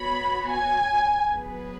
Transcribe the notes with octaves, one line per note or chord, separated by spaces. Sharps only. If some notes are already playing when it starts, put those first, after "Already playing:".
Already playing: B3 F#4 C#5 B5
G#5
F#3 B3 G#4 B4